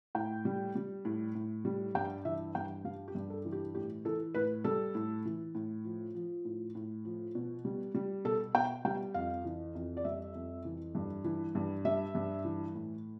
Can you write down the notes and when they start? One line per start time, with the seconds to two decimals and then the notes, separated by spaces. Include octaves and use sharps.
0.15 A2 G5
0.45 G3
0.75 G3
1.05 A2
1.35 A2
1.65 G3
1.95 G2 G5
2.25 E3 E5
2.55 G2 G5
2.85 G3 F5
3.08 G4
3.15 G2
3.30 A4
3.45 E3
3.52 G4
3.75 A2 G4
4.05 E3 A4
4.34 A2 B4
4.64 G3 A4
4.95 A2
5.25 E3
5.55 A2
5.85 F3
6.15 F3
6.45 A2
6.75 A2
7.05 F3
7.35 B2
7.65 G3
7.95 G3
8.25 B2 A4
8.55 B2 G5
8.85 G3 G5
9.14 F2 F5
9.45 E3
9.75 F2
9.97 D5
10.04 G3 E5
10.35 F2
10.65 E3
10.95 G2
11.24 E3
11.55 G2
11.85 G3 E5
12.15 G2
12.45 E3
12.75 A2